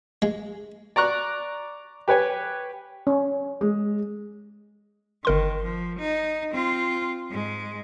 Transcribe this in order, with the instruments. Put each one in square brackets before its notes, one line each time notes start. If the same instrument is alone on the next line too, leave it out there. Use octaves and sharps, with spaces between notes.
[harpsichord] G#3
[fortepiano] D5 A#5 C#6 F#6
G4 B4 C#5 G#5
[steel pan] C#4
[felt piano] G#3
[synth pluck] G1 A#4 C6 [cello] D#3
[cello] F3
D#4
C4 F4
G#2 G#3